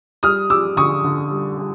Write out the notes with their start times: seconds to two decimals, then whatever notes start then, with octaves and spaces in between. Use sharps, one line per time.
0.23 G3 D#6 F6
0.50 G3 D6 E6
0.77 D3 C#6 D#6
1.04 D3
1.31 G3
1.58 G3